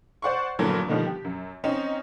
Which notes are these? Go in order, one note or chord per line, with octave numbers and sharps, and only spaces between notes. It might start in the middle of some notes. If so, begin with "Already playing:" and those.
C5 D5 F#5 C6 C#6
G2 A#2 D3 E3 F#3 B3
B2 D3 D#3 F3 G3
G4
F#2
C4 C#4 D#4